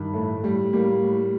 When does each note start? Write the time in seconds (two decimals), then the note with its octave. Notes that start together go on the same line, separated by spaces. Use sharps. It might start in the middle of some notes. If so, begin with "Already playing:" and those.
Already playing: G2 D#3
0.13 A2 A3
0.43 A2 G3
0.73 A2 G3 A#3
1.03 A2